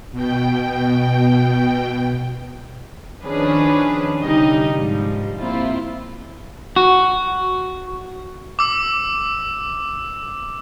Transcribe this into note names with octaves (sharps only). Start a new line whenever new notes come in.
B2 G5
D#3 F3 C#4 D4 G#4 B4
C2 D3 G3 D#4 G4 D#5
G#2 F3 G3
A#3 C4 E4 F4
F#4
D6 E6